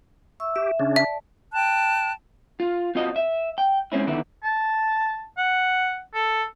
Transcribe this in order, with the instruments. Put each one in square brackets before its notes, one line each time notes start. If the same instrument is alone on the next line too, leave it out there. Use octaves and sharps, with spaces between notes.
[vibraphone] E5 C#6 E6
[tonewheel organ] G4 [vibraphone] E5
[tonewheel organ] C#3 C#4 D4
[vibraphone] D5 A5 [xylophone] E5
[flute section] G5 A5 F#6
[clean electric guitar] F4
C4 F4 F#4 D#5
E5
G5
G#3 C4 C#4 E4
D3 D#3 B3 E4
[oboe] A5
F#5
A4